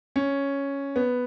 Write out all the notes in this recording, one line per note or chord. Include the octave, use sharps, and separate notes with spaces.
C#4
B3